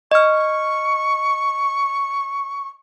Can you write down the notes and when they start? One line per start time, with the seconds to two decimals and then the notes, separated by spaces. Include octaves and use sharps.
0.11 D#5 C#6 F6